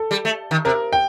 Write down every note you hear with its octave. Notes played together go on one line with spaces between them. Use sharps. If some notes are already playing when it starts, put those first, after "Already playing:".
Already playing: A4
G3
A3
D#3
C3 A#4
G5